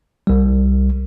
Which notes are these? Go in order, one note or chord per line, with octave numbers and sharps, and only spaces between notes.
C2 G3